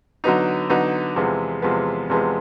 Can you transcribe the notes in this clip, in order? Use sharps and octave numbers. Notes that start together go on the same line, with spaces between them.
D3 F#3 B3 D#4
D3 F#3 B3 D#4
E2 C3 F3 G#3 B3
E2 C3 F3 G#3 B3
E2 C3 F3 G#3 B3